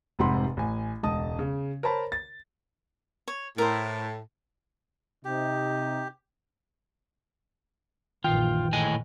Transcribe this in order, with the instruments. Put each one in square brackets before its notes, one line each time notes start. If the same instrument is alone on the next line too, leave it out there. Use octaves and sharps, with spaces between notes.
[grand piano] F1 G#2 C3 F#5 B5 C6
A1 G#5
E1 C#2 D#5 A5 D#6
C#3
A#4 C5 C#5 A5 B5
A6
[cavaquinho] C#5
[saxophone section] A2 [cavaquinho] A#4 C5
[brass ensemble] C3 D#4 [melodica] G4
[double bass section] A#1 F#2 E3 [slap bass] D#3 [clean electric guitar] F4 [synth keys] G5
[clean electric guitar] A2 D#5 G#5